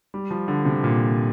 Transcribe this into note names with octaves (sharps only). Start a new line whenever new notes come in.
G3
F3
D3
C3
A#2